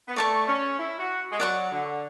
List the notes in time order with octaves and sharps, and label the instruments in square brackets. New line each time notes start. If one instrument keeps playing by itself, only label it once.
[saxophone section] B3
[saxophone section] A3 [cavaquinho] D5 A5 C#6
[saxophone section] C#4
E4
F#4
G#3
[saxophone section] F#3 [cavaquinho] D5 F#5 C#6
[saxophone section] D3